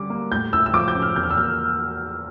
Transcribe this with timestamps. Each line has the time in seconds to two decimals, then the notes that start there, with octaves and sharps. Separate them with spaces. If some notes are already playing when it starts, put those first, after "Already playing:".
Already playing: D3 G3 C#4 D6
0.10 A#3
0.32 A2 G6
0.53 E4 E6
0.66 E6
0.73 F3 D6
0.88 G6
0.95 C#4
1.02 F6
1.16 E2 G6
1.23 F6
1.31 E6
1.37 A#3 F6